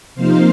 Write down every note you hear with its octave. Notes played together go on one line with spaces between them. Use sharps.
C3 F3 A#3 D#4 C5 F5